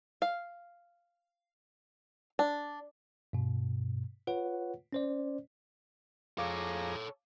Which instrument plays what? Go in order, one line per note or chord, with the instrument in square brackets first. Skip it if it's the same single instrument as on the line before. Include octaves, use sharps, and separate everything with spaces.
[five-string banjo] F5
D4
[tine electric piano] G2 B2
F4 B4 C#5 F#5
C#4 C5 D5
[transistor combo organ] F2 G#4 A#5 [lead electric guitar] A4 C#5 [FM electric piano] F5 D6